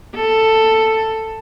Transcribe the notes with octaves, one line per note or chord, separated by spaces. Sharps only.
A4